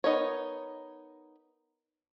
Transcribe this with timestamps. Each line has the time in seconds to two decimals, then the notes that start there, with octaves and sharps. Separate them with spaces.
0.04 B3 D#4 A#4 C#5